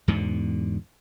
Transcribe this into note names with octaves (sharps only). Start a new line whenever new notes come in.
E2 G#2 B2 D3